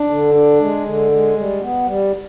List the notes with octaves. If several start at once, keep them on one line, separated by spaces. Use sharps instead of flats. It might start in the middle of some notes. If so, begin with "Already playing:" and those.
Already playing: D4
D3
D4
G#3
D3
G#3
G3
B3
G3